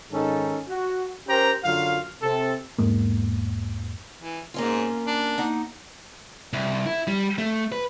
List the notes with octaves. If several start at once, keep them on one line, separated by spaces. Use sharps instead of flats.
G#2 D#3 C#4 D#4 A4
F#4
C#4 G4 A#4 C5 G5 A#5
F#2 D3 F#3 F4 F5
C3 C4 A4
E1 G#2 G#3 A#3
E3
G#2 A#3 C#4 F4
D4
A#3 D#4 F#5
C2
E4
G3
A3
B4